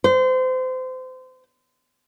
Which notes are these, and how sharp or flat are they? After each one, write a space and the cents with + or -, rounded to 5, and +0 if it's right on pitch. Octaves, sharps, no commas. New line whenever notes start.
C5 -30